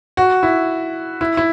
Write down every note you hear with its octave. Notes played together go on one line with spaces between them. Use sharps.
F#4
E4
E4
E4